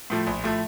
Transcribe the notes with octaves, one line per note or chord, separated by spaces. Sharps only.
A2 F3 A3
A#1
A2 F3 A3